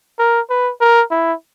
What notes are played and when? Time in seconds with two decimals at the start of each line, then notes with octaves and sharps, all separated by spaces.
0.19 A#4
0.50 B4
0.81 A#4
1.11 E4